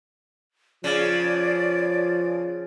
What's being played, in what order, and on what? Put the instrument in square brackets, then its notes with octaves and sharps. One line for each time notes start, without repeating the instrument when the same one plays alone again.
[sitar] C#3 [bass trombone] F3 [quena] D5